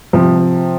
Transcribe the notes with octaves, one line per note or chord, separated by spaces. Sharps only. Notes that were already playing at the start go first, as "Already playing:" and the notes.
C3 F3